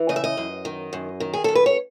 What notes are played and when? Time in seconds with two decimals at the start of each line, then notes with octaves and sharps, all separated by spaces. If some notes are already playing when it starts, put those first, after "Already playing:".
Already playing: E3
0.09 C#3 D#5
0.16 E5
0.24 D#5
0.37 F#2
0.65 D#3
0.93 F#2
1.20 D#3
1.34 G#4
1.44 F#2 A4
1.55 B4
1.66 C#5